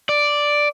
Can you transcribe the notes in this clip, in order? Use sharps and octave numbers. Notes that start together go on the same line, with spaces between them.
D5